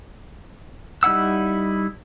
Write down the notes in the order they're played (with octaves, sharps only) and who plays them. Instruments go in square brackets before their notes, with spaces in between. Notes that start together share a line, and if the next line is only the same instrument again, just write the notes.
[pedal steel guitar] G3 D#4 E4 F#5 E6